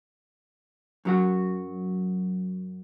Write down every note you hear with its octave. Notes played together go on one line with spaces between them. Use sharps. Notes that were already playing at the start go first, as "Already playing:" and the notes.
F#2 F#3 F#4